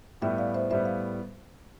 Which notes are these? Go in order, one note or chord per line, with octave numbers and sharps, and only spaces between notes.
A2 G3 B3 E5 G5
D5 F5
C5 E5
A2 G3 B3 C5 E5
F5